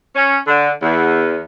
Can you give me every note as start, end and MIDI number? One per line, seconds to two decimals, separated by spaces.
0.14 0.38 61
0.47 0.70 50
0.82 1.42 40